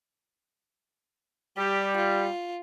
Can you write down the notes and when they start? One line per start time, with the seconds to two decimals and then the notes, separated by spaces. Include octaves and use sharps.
1.57 G3 G4
1.96 F4